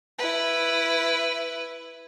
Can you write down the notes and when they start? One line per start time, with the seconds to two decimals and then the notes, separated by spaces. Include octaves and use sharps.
0.19 E4 B4